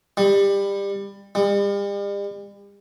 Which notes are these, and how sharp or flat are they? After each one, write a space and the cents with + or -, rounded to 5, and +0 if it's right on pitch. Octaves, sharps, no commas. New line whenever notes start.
G3 +20
G3 +40